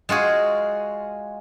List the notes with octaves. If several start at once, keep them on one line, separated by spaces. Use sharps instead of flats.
G#3 F4 F#4 G#4